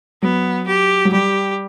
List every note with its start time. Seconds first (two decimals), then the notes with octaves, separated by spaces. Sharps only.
0.22 F#3 B3
0.67 G4
1.05 F#3
1.12 G3 G4